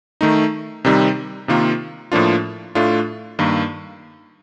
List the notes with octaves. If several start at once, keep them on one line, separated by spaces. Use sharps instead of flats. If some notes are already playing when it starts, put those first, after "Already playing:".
D#3 A3 D#4
C3 D#3 G3 C4 D#4
C3 D#3 A#3 F4
A2 F3 A#3 D4 F4
A2 A3 D4 F4
G2 D#3 A#3